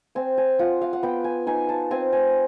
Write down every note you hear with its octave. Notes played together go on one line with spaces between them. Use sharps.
C4 G#5
G#5
F4 F#5
F5
F#5
B3 G5
G#5
D#4 G#5
A5
C4 G#5
G#5